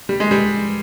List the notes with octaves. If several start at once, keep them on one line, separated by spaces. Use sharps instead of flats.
G3
G#3
G3